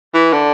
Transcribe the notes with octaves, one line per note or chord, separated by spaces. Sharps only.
E3
D3